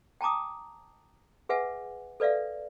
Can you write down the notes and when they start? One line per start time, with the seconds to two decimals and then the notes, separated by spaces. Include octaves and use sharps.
0.21 G5 A5 A#5 D6 D#6
1.49 G#4 B4 E5 F#5 G#5
2.20 A4 B4 D5 E5 F5